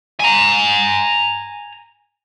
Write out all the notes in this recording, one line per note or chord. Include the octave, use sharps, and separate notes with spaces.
G#5 A#5